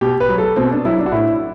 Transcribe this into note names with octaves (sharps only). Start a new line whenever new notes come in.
B2 G4
B4
F#3
A4
B2 C4
D4
F#3 E4
D4
F#4
A2 E4